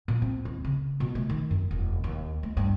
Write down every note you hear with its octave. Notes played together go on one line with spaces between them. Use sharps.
A#2
C4
D#2
C#3
B2
A3
D#3
F#2
E1
D#2
A3
G2